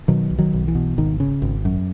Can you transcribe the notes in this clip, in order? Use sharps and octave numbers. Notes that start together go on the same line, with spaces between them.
B2 D#3 F#3
B1
D#3 F#3
B1
E3
B2
G#1 D#3
C#3
G#1
F#2